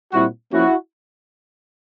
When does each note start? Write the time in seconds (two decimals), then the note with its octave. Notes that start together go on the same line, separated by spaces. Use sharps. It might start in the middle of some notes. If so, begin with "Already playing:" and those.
0.13 A#2 G3 C4 E4 F#4
0.52 F3 A#3 C#4 E4 F#4